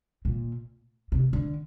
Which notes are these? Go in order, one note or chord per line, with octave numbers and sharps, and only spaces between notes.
A#2
C3
D3